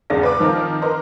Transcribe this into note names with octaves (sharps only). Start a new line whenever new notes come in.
G#1 E2 C#3 G#3 D5 A#6
B4 D6
D#3 F3 C4 D#4 A#4
A#4 B4 D#5 A#5 C6